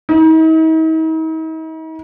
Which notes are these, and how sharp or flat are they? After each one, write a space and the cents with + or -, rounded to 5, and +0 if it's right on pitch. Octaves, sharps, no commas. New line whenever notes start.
D#4 +45